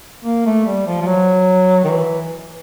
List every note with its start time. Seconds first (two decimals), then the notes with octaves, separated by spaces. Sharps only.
0.25 A#3
0.46 A3
0.66 G3
0.87 F3
1.01 F3
1.07 F#3
1.84 D#3
1.89 E3